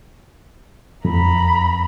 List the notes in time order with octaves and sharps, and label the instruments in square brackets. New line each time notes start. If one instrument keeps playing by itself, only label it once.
[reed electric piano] F2 [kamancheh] A#5 B5